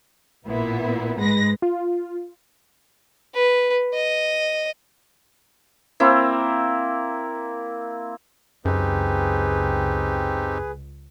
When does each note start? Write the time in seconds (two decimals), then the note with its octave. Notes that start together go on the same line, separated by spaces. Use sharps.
0.44 A1 A#2 B3 E4
1.17 G#2 G#3 B4 A#6
1.62 F4
3.34 B4
3.94 D#5
6.00 A#3 C4 E4
8.65 C#2 F#2 C4 D#4 G4 G#4 B4